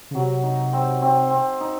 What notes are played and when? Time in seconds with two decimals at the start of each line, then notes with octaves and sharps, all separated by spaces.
0.11 C#3
0.15 C3 F#3
0.43 D#4
0.73 C4
1.02 C4
1.31 C4
1.61 D#4